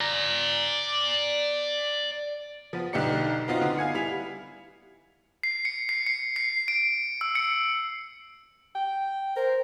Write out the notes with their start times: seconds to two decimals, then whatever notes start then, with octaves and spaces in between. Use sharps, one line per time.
0.01 D5 A#5
2.73 F3 B3
2.93 B1 D3 D#4 G4 D5 C#7
3.48 B3 C4 D#4 F4 F#4
3.61 D3 B3
3.78 F5 G#5 G#6 C#7
3.95 G3 E4 F7
5.43 C7
5.65 C#7
5.89 C7
6.07 C#7
6.36 C7
6.68 D7
7.21 E6
7.35 C#7
8.75 G5
9.36 A#4 C5